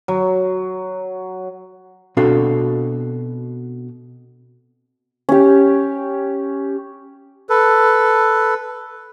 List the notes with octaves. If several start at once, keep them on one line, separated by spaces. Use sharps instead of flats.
F#3
B2 C4 D4 F#4 A4 F5
C#4 G4
A4 B4